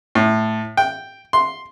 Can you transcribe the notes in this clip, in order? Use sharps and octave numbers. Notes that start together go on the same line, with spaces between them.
A2
G5
C6